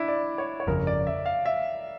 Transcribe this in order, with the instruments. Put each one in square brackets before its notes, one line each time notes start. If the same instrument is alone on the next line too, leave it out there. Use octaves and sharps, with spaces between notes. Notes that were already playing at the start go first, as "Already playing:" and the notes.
Already playing: [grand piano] D4 E4
D5
C#5
C#5
[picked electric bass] G1 F2 C#3 [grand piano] A#4
[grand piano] D5
E5
F5
E5